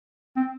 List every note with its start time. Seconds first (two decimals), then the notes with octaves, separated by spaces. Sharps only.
0.36 C4